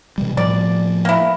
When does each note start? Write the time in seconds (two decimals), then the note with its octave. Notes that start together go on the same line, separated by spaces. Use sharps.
0.18 B2 E3 G3
0.37 A2 F3 D5
1.05 A#3 E4